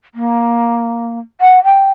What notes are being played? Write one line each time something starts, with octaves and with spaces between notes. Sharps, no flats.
A#3
F#5
G5